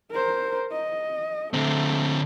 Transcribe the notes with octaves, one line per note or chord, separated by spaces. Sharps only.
A#4 C5
D#5
D3 A3 C4